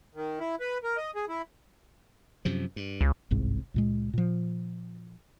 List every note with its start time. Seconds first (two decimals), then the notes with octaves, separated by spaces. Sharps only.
0.15 D#3
0.40 E4
0.60 B4
0.84 A#4
0.97 D#5
1.16 G#4
1.29 E4
2.45 F#2 C3 F3
2.76 G2
3.01 C#2
3.31 G1 C2 G#2 C3
3.74 C#2 A#2 G#3
4.14 A#2 F3